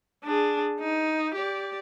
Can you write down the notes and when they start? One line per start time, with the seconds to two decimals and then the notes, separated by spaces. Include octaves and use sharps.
0.24 D4 G#4
0.79 D#4
1.34 G4 D5